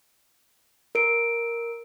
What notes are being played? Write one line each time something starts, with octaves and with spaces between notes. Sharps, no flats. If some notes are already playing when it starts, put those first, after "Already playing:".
A#4 D7